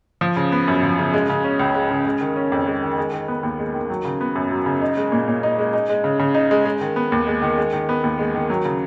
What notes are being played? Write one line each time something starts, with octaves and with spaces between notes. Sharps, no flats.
F3
C#3
B3
F#2
F3
C#3
G#3
C#3
C#4
C#2
G#3
C#3
G#3
D#3
C#4
F2
G#3
D#3
G#3
D#3
B3
D#2
G#3
D#3
F#3
C#3
B3
F#2
F#3
C#3
D#4
G#3
A#2
A#2
D#4
G#3
D#4
G#3
C#3
C#3
D#4
G#3
G#3
D#3
B3
D#2
G#3
D#3
G#3
D#3
B3
D#2
G#3
D#3
F#3
C#3